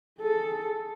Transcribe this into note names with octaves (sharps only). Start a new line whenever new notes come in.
G#4 A4